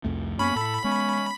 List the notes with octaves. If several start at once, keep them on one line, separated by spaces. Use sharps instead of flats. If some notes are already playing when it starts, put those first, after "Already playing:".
C2 F2 A3
F#2 A#3 B3 C#4 B5
A2 A4
G#3 B3 C#4